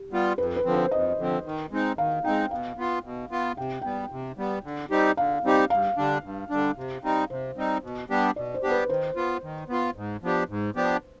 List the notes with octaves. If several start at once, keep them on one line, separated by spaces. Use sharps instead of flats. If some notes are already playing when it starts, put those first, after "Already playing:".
Already playing: G4
G3 B3 F4
F2 B4
B4
D3 F3 C4
C5
F2 D#5
D3 F3 C4
D#3
G#3 C4 D#4
D#3 F5
G#3 C4 D#4 G5
B2 F5
B3 F4
B2
B3 F4
C3 G5
G3 B3 G5
C3
G3 B3
D3
G3 C4 D#4 G4
D3 F5
G3 C4 D#4 G4
G2 F5
D3 G3 D4
G2
D3 G3 D4
C3
G3 C4 D#4
C3 C5
G3 C4 D#4
B2
G3 B3 D4 G4
B2 D5
C5
G3 B3 D4 G4
B4
D#3 C5
B3 F4
D#3
B3 F4
G#2
F3 B3 D4 G4
G#2
F3 B3 D4 G4